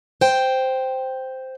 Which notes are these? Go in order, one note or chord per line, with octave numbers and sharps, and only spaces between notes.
C5 G5